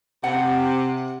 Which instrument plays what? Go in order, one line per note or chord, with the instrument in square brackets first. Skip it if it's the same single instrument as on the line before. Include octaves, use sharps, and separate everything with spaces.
[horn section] C3 [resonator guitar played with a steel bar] F#5